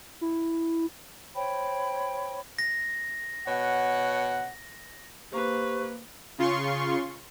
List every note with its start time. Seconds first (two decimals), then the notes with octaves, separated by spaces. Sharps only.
0.21 E4
1.35 C5 C#5 G5 B5
2.59 A#6
3.47 B2 C#5 F#5
5.32 A#3 G4 B4 C5 C#6
6.38 C#3 F4 C6 C#6